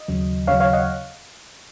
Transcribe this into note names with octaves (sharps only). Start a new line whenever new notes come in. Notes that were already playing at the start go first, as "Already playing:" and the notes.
Already playing: D#5
D#2 C#3 F#3
D#2 C#3 F#3 C#5 F5
C#5 F5
D#5 F#5